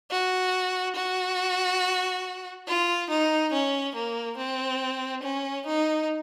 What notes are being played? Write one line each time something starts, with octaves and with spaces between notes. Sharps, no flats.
F#4
F#4
F4
D#4
C#4
A#3
C4
C#4
D#4